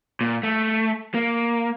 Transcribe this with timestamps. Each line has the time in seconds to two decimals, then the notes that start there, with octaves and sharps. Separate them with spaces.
0.21 A#2
0.43 A3
1.14 A#3